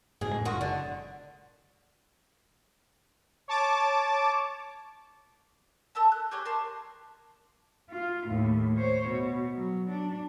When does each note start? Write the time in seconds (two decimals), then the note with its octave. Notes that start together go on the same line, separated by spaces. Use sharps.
0.21 F#1 G#2 B2 G#4
0.33 E1 A2 G#3
0.45 F#1 D#3 F4 F#4
0.61 D3
3.48 C#5 A5 D6
5.95 A4 A#4 E5 A5
6.12 F#6
6.31 G4 G#4 C#5 D#5
6.45 A#4 A5 C6
7.90 F4
8.28 D#2 A2
8.77 C5 C#5
9.09 B2
9.56 F#3
9.90 D4